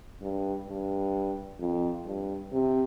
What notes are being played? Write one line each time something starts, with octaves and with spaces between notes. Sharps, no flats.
G2
G2
F2
G2
C3